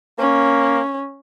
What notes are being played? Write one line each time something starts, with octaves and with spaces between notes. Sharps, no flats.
A#3 C#4